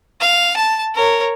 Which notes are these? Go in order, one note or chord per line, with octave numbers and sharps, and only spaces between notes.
F5
A5
A#4 C#5